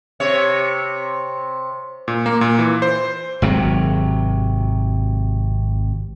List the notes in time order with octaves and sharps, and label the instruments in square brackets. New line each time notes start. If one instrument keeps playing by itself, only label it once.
[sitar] C3 C#5
[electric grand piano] A#2
A#3
A#2
E3
C5
[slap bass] G#1 C3 F#3